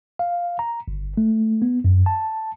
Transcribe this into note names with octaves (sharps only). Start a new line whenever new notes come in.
F5
A#5
G1
A3
B3
F#2
A5